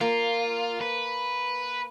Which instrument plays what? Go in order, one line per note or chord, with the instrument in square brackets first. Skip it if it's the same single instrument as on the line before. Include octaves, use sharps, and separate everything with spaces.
[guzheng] A#3 [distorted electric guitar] F4
[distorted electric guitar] B4